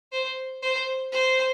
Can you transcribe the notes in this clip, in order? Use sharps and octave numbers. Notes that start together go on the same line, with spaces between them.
C5
C5
C5